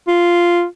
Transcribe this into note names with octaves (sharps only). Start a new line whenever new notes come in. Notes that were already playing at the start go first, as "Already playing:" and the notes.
F4